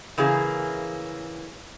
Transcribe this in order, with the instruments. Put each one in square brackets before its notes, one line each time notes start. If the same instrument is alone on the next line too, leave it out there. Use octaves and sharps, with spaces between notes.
[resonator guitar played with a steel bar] C#3 E3 A#3 G#4